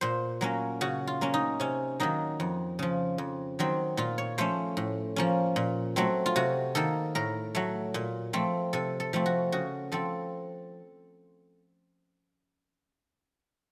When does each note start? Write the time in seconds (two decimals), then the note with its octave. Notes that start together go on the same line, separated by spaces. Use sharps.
0.01 A#2 C5
0.41 F#3 A#3 C#4
0.81 C#3 F#4
1.07 F4
1.21 F#3 A#3 C#4
1.34 D#4
1.60 C3 C#4
2.00 D#3 F#3 A#3 D#4
2.40 F2
2.79 C#3 F3
3.18 F2
3.59 D#3 F#3 C4
3.97 A#2 F4
4.18 C#5
4.38 F3 A3 C#4 C5
4.77 A2
5.16 F3 A#3 C#4
5.56 A#2
5.96 F#3 A3 C4
6.26 F4
6.36 C3 F#4
6.75 D#3 A#3 A4
7.15 A2 A#4
7.55 F#3 A3
7.94 A#2
8.33 F3 A3 C4
8.73 C3 A4
9.00 A4
9.13 F3 A3 C4
9.26 F#4
9.52 C#3 F#4
9.92 F3 C4 A4